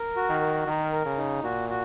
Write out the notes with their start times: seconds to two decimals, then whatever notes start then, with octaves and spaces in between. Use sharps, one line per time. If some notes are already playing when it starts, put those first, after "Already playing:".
Already playing: A#4
0.16 F#4
0.29 D#3
0.41 A#4
0.67 D#3 A#4
0.92 A#4
1.05 C#3
1.18 D#4
1.43 A#2 F#4
1.69 F#4